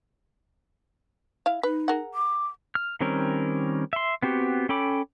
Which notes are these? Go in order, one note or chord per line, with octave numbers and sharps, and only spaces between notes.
E4 F5
D#4 B4
G#4 A#4 F#5
D6
F6
D#3 G3 C4 C#4 A#4
E5 C6
B3 C4 F#4 G4
C#4 A4 G5 B5 D6